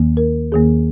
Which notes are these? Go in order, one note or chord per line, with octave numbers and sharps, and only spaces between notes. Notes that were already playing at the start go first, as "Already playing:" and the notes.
Already playing: D#2 D#3 A#3
A#4
D#2 D#3 A#3 G#4